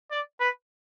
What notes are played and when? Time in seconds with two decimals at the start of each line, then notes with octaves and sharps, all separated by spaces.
0.11 D5
0.40 B4